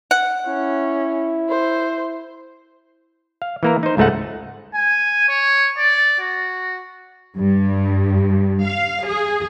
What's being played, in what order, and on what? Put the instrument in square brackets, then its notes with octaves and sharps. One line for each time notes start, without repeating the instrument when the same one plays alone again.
[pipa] F#5
[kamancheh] C#4 [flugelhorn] E4
[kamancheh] C5
[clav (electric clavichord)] F5
E3 A#3 A#4
D#4 C5
C#2 G#2 A3 D#4 F#5
[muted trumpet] G#5
C#5
D5
F#4
[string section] G2
F5
G#4